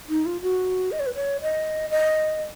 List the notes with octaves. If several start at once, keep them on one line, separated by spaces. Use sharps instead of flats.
D#4
F4
F#4
D#5
C#5
B4
C#5
D#5
D#5